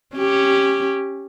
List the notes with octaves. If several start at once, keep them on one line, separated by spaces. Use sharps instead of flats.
C#4 G4